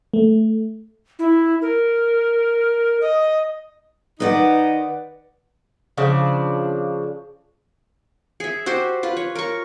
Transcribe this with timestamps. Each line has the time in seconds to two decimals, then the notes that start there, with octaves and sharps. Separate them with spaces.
0.14 A3
1.19 E4
1.62 A#4
3.01 D#5
4.20 D#3 D#4 B4 D5 F#5
5.97 C#3 F3 D4
8.40 G#4 E5
8.66 F#4 G4 C5
9.03 F4 B4
9.17 C#5
9.35 A#4 C#6